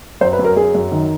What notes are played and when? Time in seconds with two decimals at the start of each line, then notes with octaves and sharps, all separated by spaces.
0.21 F#2 C5
0.33 B4
0.39 F#2
0.45 A#4
0.56 F#2 G#4
0.75 F#2
0.92 D#3